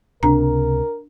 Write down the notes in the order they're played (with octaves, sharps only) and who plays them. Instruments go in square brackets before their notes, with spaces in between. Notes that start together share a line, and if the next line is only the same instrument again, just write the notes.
[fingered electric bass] C#2 C3 [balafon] D4 A#5 [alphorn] A#4